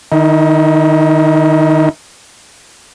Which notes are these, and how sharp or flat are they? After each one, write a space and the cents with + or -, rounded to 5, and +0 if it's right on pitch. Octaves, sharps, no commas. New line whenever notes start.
D#3 -20 D#4 +45